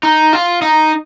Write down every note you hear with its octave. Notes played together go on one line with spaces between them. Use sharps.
D#4
F4
D#4